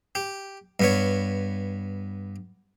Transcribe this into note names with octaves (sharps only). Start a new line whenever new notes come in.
G4
G2 B3 C#5